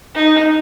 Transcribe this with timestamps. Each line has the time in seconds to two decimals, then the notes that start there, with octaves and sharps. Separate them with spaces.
0.14 D#4